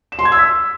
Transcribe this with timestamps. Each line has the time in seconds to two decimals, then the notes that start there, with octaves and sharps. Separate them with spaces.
0.12 E7
0.19 C6
0.25 G#6
0.32 E6
0.39 B6